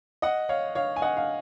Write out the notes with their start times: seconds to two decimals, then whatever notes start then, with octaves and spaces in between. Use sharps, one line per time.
0.22 D#5 F#5
0.49 C#5 F5
0.75 C#5 F5
0.96 G#5
1.02 D#5 F#5
1.17 F5